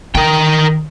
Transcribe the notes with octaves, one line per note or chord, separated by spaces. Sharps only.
D#3 A#4 G5